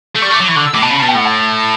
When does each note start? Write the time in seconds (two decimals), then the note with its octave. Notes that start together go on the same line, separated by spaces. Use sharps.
0.16 A3
0.22 G3 C#6
0.31 A3
0.34 D6
0.40 F#3
0.46 E3 C#6
0.56 D3 D6
0.66 E6
0.74 A2 D6
0.82 B2 A5
0.91 C#3 B5
1.00 B2 A5
1.09 G5
1.15 A2 F#5
1.25 A5
1.60 A5